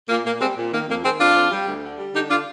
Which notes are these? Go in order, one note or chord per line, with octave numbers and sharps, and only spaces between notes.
A#2 A#3
A#2 A#3
G3 G#3 C4
A#2
D#3 A#3
F2 A#3
D#3 G#3 C4
F2 D4 F4
F2
G3
D2
D3
G3
D3 D#4 G4
D3 D4 F4